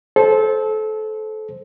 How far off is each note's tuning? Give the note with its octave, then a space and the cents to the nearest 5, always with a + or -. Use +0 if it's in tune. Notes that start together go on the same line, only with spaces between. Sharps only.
A4 -25 C5 +0